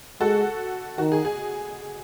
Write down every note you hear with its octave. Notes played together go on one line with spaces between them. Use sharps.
G#3 F#4 A4
D#3 F#4
G#4
G#4